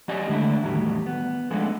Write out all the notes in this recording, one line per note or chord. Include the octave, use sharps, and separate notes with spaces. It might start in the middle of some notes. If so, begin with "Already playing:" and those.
F#3 C#4 G4 D5 D#5
D3 G#3 A3 D4 E4
E2 A2 D#3 F#3 G3
B3
F3 G#3 A3 B3 D4 D#4